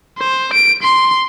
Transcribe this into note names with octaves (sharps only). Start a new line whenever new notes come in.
C5
D7
C6